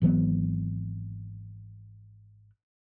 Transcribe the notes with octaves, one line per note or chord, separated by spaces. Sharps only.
G#1 E3 F#3 B3